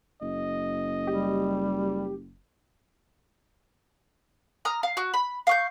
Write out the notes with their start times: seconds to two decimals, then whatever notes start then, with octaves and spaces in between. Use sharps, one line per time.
0.21 F#1 D#5
1.07 G3 G4
4.65 A#5 D#6 F6
4.83 F5
4.97 F#4
5.14 B5
5.47 F5 C#6 G6